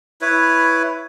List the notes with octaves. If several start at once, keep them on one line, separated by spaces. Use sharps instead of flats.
E4 B4 C#5